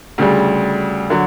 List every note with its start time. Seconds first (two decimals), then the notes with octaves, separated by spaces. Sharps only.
0.18 D2 C#3 G3
1.10 D3 F#3